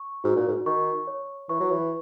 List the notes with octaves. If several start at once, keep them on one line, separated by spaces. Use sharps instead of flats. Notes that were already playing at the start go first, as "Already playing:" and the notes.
Already playing: C#6
G#2 F#4
A#2
G#2
D#3 C#6
C#5
E3 C#6
F#3
E3